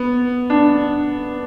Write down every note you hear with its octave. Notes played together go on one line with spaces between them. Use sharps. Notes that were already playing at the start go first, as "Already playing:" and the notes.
Already playing: B3
D4